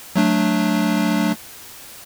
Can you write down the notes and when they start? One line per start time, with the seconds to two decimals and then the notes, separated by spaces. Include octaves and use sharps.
0.16 F#3 A3 D4